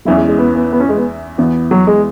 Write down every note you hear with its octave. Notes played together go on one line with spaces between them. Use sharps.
E2 E3 F#3 C#4 E4
G#3
G#3
B3
B3
B3
C#4
G#3
B3
E2 E3 B3
F#3
G#3